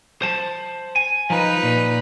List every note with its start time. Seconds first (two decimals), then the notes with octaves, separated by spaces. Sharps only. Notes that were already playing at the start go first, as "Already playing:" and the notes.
0.22 C5 A5
0.96 G#5
1.30 F3 D#4 B4
1.63 A#2